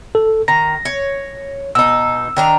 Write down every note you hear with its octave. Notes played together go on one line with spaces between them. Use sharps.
A4
D#3 A#5 A#6
C#5
B2 D#4 E6
D#3 D4 A#5